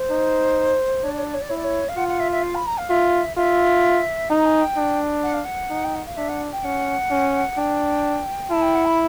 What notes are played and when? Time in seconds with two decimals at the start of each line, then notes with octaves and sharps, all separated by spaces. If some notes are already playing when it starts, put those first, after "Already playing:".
Already playing: C5
0.10 D#4
1.03 D4 C#5
1.11 D5
1.18 C#5
1.26 D5
1.34 C#5
1.42 D5
1.49 E4 C#5
1.57 D5
1.64 C#5
1.88 F5
1.96 F4 F#5
2.08 F#5
2.19 E5
2.31 E5
2.43 F5
2.55 B5
2.66 A#5
2.78 F5
2.90 F4 E5
3.37 F4 E5
4.30 D#4 A#5
4.45 G#5
4.61 G5
4.76 D4
5.23 F#5
5.33 F5
5.45 F#5
5.70 D#4
5.84 G5
5.95 F#5
6.06 F5
6.16 D4 E5
6.29 F#5
6.52 G5
6.63 C#4 F#5
7.10 C#4
7.57 D4 G5
8.51 E4 A5
8.62 G5
8.75 F#5
8.85 B5